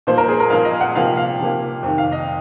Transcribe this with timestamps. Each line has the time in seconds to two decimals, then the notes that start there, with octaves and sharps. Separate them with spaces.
0.07 A#2 F3 A#3 C5
0.18 A#4
0.28 G#4
0.40 A#4
0.50 A#2 F3 A#3 F5
0.65 D#5
0.81 F#5
0.95 C3 F3 A#3 F5
1.17 F5
1.39 C3 F3 A#3
1.83 F2 C3 D#3
1.98 F5
2.12 D#5